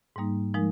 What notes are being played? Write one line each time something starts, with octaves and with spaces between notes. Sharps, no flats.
G#2 G3 A#3 D#4
F3 G#3 D#4 A#4